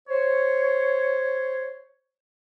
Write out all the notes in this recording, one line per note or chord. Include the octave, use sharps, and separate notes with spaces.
C5 C#5